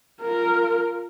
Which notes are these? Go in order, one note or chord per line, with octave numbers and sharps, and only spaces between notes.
F4 A#4